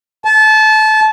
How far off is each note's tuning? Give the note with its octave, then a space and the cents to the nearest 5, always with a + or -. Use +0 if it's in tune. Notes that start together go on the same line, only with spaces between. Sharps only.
A5 -25